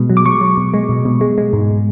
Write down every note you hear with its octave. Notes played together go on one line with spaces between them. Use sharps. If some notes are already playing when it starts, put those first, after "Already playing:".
Already playing: B2 G#3
F#3
D6
F#3 C#6
F#3
B2
G#3
B2
B2
G#3
G#3
G#2